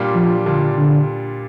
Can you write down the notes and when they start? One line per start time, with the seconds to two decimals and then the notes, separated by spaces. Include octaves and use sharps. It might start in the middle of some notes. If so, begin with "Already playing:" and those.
Already playing: A#2 G3 D4 F4
0.15 F3
0.46 A#2 D3 G3 D4 F4
0.77 D3